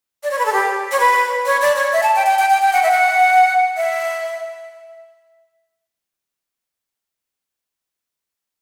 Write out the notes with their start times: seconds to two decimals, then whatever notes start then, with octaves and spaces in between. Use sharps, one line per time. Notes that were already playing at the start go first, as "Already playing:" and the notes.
0.23 D5
0.31 C#5
0.39 B4
0.46 A4
0.53 G4
0.92 C#5
1.00 B4
1.46 C#5
1.62 D5
1.76 C#5
1.93 E5
2.03 A5
2.16 G5
2.26 G5
2.39 G5
2.50 G5
2.62 G5
2.73 F#5
2.83 E5
2.91 F#5
3.77 E5